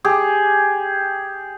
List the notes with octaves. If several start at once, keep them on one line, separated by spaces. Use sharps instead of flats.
G4 G#4